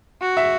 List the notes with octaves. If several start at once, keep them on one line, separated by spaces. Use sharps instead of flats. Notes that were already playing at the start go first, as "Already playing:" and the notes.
F#4
E5